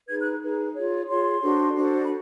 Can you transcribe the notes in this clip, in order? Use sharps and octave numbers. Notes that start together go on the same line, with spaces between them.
D#4 G#4 B4 G#6
F#6
D#4 G#4 B4
F4 G#4 C#5
F4 G#4 C#5 C6
D4 F#4 A4 C5
D4 F#4 A4 C5
B5